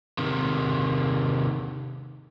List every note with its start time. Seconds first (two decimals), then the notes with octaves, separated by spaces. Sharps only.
0.18 C3 D#3